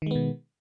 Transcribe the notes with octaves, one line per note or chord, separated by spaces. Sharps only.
B2 D#3 G#3 B3